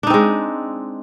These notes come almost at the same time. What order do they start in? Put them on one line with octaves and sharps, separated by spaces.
D4 D#4 C4 G#3